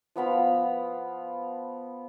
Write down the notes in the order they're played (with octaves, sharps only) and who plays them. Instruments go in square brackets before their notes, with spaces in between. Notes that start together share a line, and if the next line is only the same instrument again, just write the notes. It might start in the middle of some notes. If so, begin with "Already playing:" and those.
[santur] F3 B3 F5 B5